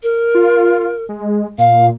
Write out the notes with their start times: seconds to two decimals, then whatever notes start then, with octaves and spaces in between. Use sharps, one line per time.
0.03 A#4
0.35 F4
1.09 G#3
1.58 A#2 F5